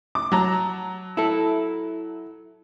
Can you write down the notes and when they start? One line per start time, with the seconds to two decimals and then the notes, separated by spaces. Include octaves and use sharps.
0.15 D6
0.32 F#3 A5 A#5
1.17 E4 A4